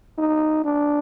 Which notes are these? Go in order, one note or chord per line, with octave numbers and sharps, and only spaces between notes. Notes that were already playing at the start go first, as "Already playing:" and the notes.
D#4
D4